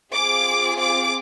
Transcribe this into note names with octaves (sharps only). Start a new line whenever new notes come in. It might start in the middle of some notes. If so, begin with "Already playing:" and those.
C4 F4 G#4 D6
D6